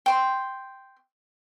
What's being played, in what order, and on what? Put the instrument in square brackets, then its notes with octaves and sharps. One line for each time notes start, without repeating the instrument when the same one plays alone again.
[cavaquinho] G5 C6